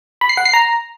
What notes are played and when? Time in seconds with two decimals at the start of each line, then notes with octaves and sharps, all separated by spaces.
0.21 B5
0.29 C7
0.37 F#5
0.45 C7
0.53 A#5